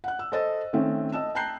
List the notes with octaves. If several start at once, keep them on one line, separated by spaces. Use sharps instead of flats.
F#5 F#6
E6
A4 C5 D#5 E6 A6
D#3 A3 C4 C#4
D#5 A5 E6 E7
G5 A5 A#5 F#6 G6 C7